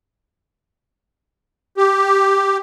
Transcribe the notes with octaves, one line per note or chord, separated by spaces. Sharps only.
G4